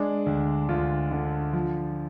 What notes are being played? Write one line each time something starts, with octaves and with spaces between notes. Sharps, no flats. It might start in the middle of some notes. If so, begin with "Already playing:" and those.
Already playing: G#3 D4
D2
D2 F4
D3
F3